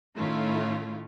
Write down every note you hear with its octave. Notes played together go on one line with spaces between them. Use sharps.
A2 D#3 A3 C#4 E4 F4